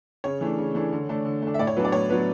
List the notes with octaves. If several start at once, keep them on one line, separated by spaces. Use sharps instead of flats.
C#3 C#5
E3 A3 D4
C#3
E3 A3 D4
D3
A3 D4
D3
A3
D4
E5
A2 D5
C#5
F#3 B3 D4 B4
D5
A2 C#5
F#3 B3 D4 B4